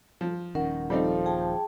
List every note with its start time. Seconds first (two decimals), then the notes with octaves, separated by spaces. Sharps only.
0.21 F3
0.55 D#1 D#3 C#4 A#4 F#5
0.90 F3 G3 C4 D#4 A4
1.26 G#4 G5 A5